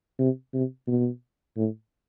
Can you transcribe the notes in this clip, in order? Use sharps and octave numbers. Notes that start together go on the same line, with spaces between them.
C3
C3
B2
A2